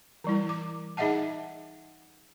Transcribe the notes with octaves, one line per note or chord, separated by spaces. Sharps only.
E3 G3 E4
D6
D#4 G#4 D#5 E5 F#5 A5